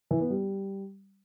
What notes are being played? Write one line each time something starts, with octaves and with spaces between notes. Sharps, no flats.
E3
B3
G3